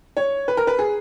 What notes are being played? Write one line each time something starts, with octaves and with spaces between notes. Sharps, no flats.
C#5
B4
A#4
B4
G#4